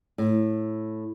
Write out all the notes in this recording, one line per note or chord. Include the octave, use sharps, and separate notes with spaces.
A2